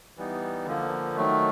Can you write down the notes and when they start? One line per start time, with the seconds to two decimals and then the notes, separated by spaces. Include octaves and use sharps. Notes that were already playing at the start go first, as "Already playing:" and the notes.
0.17 E3 G3 B3 D#4
0.67 D3 F3 A#3
1.16 D#3 F#3 A3